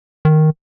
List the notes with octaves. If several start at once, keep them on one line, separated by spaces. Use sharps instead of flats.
D#3